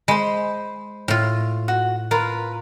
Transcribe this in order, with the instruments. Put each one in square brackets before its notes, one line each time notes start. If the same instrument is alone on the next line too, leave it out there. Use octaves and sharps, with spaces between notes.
[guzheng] G#3 [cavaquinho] C5 B5
[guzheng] A2 F4
[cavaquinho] F#4
[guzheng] F4 [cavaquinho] A#4 B4